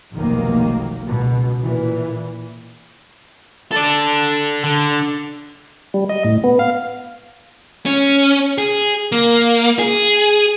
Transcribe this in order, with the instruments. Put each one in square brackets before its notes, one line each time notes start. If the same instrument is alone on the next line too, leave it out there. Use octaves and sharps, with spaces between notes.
[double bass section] F1 B1 D#3 A#3
C#2 B2
A#2 E3
[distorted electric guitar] A4 D5
D3
[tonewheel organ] G3
D#5
A2
B3
F5
[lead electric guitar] C#4
G#4
A#3
G#4